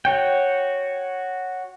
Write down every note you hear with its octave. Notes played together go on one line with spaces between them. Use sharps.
F#4 C#5 G5